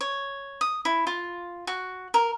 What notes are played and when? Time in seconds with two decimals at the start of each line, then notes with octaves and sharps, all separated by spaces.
0.01 C#5
0.61 D#6
0.85 E4
1.07 F4
1.67 F#4
2.14 A#4